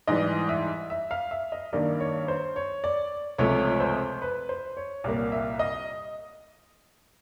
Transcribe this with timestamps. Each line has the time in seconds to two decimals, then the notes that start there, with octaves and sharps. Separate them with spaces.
0.07 G#2 E3 G3 D#5
0.49 E5
0.90 E5
1.11 F5
1.31 E5
1.52 D#5
1.73 G2 D#3 G3 A#3 D5
2.00 C#5
2.28 C5
2.56 C#5
2.84 D5
3.38 C#2 C3 F3 A3 C#5
3.80 C5
4.22 B4
4.49 C5
4.77 C#5
5.04 C2 A#2 G3 A#3 D5
5.32 E5
5.59 D#5